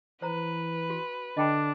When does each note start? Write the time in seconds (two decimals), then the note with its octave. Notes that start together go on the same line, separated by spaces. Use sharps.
0.22 E3 B4 C5 A#5
0.90 F#4
1.37 D3 D4 D#5 G5 B5